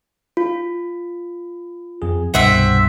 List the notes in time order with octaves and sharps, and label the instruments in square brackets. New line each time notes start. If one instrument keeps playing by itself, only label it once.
[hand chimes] F4
[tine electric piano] F2 G#4
[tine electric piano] C2 G2 B2 [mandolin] C4 E5 F#5